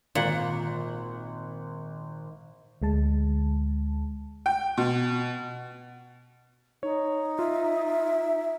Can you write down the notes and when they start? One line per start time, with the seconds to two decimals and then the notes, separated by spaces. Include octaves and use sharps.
0.15 G#1 A#2 F#5
2.82 D2 G#3 A5
4.46 G5
4.77 B2
6.83 D#4 C#5
7.39 F4 E5